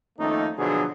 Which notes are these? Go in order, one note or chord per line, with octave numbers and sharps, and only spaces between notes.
F2 D#3 A3 A#3 C#4 D#4
B2 D3 F3 F#3 D4 G#4